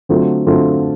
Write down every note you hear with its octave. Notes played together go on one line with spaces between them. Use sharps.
D3 F#3 A3 C4 F4
D3 F#3 A3 C4 F4